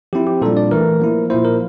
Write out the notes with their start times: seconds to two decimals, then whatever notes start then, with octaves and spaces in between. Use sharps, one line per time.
0.13 F3 C4 E4 G4
0.27 G4
0.42 A#2 G3 D4 A4
0.57 D5
0.71 E3 A3 E4 A#4
1.01 F3 A#3 E4
1.30 A#2 F3 A#3 E4 C5
1.45 A#4